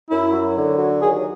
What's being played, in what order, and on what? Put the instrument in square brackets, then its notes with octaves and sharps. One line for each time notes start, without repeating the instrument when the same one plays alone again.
[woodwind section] F#2 [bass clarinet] E4
[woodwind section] F#3
D3
F#3
[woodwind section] D#2 [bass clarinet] G#4